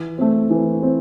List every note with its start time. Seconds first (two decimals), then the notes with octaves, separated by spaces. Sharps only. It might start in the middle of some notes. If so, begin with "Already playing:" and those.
Already playing: E3
0.18 A3 C4
0.50 E3
0.82 C4